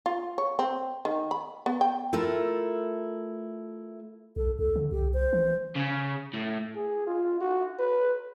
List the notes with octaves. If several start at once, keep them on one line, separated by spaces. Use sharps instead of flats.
F4
C#5
C4
D#3
B5
B3
G5
A3 E4 F4 A4 A#4
B1 A4
C#2 A4
D3
C2 G4
C5
E3
C#3
A2
G#4
F4
F#4
B4